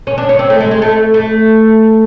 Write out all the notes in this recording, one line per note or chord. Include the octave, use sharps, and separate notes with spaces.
C#4
D4
C#4
C4
A3
G#3
G#3
A3
A3